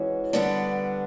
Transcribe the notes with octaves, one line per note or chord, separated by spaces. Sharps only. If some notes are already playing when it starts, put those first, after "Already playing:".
Already playing: E3 G#3 C#4 F#4
D3 G3 B3 D4